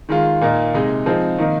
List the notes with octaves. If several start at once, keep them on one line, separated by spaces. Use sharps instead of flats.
D#3 G#3 F4
A#2 A#3 D#4
C3 G#3 D#4
F3 G#3 C4 D#4
D#3 A#3 D#4